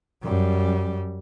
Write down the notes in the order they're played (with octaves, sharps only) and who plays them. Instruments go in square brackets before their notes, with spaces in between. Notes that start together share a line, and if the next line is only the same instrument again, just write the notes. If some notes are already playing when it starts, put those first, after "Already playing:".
[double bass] F#2 G3